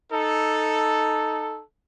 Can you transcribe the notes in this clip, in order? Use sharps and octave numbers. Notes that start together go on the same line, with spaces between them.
D#4 A4